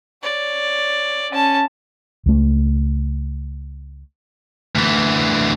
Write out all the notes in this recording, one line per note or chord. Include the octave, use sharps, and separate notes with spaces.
C#5 D5
C#4 A5
C#2 A3
D2 E3